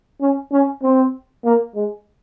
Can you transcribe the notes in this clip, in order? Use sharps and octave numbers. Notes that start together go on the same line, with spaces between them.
C#4
C#4
C4
A#3
G#3